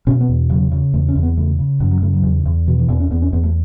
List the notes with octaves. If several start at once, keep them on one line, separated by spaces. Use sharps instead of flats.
B2 C#4
B3
E2
C#3 F#3
C#3
E2 A3
C#4
E2
B3
C#3 A3
C#3
F#2 F#3
F#3
C#3 A3
F#3
E2
E2
B2 E3
E3
E2 B3
C#4
E2 B3
C#4
E2 B3
A3